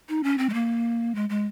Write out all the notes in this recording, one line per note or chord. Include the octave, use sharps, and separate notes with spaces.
D#4
C#4
C4
G#3
A#3
G#3
G#3